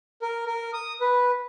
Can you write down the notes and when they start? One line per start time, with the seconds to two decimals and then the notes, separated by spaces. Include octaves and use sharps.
0.22 A#4
0.47 A#4
0.73 D#6
1.01 B4